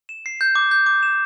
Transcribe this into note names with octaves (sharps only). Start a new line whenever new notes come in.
E7
C7
G6
D6
G6
D6
E7